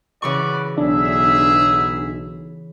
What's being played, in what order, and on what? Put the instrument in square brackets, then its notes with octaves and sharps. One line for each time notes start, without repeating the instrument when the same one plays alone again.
[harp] C#3 E3 C#6 [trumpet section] F#4 B4 D5
[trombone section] B1 [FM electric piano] D4 [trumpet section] G#4 E5